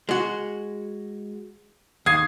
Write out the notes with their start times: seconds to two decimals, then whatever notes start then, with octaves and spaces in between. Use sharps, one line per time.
0.09 G#3 F#4
2.06 D#2 D#6 G#6 C7